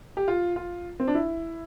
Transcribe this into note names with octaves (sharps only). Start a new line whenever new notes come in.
G4
F4
F4
C4
D4
E4